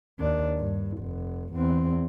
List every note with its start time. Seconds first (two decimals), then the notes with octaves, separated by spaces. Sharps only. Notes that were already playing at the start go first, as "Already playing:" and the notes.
0.20 D#2 D4
0.58 G2
0.99 F1
1.54 E2 C4